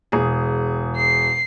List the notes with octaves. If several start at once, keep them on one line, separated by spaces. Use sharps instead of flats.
E1 G#4
C7